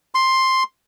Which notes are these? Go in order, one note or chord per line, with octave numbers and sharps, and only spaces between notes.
C6